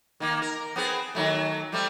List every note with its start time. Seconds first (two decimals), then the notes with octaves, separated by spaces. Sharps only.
0.20 D#3 A#3
0.42 A#4
0.76 B3 C4 G#4
1.15 D#3 F#3 A3
1.72 G3 A3 C4